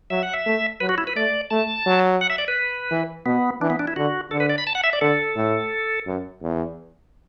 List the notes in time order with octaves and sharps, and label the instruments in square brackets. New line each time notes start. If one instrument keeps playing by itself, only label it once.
[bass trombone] F#3 [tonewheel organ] E5
[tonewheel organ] F#5
E5
[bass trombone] A3
[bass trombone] F#3 [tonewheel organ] B4
[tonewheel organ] F#4
E4
B4
[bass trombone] A3 [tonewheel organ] D5
[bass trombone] A3 [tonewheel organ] A5
[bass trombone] F#3
[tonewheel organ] F#5
E5
D5
B4
[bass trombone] E3
[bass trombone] B2 [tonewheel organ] B3
[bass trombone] E3 [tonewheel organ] D4
[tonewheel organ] B3
D4
E4
[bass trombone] D3 [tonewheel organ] F#4
[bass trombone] D3 [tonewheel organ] A4
[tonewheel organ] B4
D5
B5
A5
F#5
E5
D5
[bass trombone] D3 [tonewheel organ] A4
[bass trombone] A2
F#2
E2